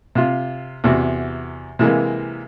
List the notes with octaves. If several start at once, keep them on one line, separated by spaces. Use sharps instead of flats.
C3 F4
E2 C3 F#4
C3 E3 G#3 A#3